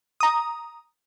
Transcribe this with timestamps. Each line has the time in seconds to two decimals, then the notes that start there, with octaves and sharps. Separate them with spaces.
0.20 A#5 D#6